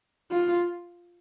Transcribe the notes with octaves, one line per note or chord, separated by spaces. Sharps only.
F4